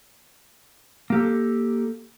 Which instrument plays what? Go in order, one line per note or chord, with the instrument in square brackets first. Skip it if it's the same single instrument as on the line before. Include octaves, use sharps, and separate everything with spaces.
[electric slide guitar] A#3 G4 A4